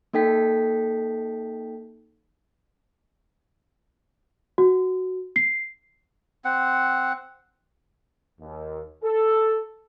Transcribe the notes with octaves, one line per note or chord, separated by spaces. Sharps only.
A#3 D#4 A4 G5 B6
F#4
C7
C4 F#5
D#2
A4